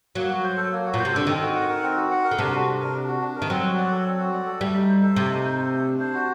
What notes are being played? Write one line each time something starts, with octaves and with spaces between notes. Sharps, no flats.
F#3 A#3
F#4
C5
A4
A#3
F#4
A#2 C5
C3
D3 A4
D#3 C4
F#4
F#5
A#4
C4
F#4
F#5
A#4
D3
C3 D4
F#4
D4
A#4
D4
F#4
D4
A#4
D#3
F#3 C4
F#4
D5
A4
C4
F#4
D5
A4
G3 A3
D#4
C5
A4
C3 A3
D#4
C5
A4
A3
D4
C5
F#4